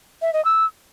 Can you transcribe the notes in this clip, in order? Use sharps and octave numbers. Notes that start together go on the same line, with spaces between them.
E5
D#5
E6